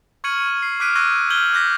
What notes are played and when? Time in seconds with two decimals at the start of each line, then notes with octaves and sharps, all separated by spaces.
0.24 C#6 F6 G#6 C#7 D#7 F#7
0.62 C7
0.80 D6 F6 F#6 B6 D7 D#7
0.95 C#6 E6 F#6 G#6 A#6 D#7
1.30 F6 G6 G#6 F#7 G7
1.53 D6 F#6 G6 A#6 B6